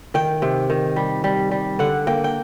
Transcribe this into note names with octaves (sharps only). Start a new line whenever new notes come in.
D#3 G5
C3
D#3
G3
G3
G3
D3 F#5
A#3 G5
G5